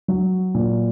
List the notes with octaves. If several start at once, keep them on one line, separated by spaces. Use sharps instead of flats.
F#3
A#2